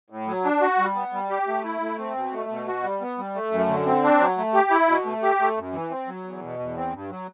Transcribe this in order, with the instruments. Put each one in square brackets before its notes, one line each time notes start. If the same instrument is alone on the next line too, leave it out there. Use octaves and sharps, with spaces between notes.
[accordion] A2
F#3
D4
F#4
G3
B3
G3
G4
A3
E4
A3
C4
B2
A3
B2
F#4
G3
B3
G3
A3
F#2
D3
C4
D4
F#3
A3
G4
E4
B2
A3
G4
A3
F#2
E3
C4
F#3
E2
B2
E2
C4
G2
F#3